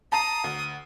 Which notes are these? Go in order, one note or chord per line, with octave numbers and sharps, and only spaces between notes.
A5 A#5 D#6 C7
D2